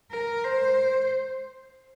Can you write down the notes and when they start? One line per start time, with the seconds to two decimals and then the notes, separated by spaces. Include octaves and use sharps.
0.11 A#4
0.44 C5